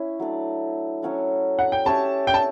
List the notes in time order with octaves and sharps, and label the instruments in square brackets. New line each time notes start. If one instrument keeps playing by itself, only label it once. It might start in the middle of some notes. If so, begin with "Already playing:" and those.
Already playing: [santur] C#4 E4
F#3 A3 D4
F#3 C#4 F#4 A4
[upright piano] F#5
G5
[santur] C#4 G4 C#5 E5 [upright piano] A5
[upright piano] G5
A5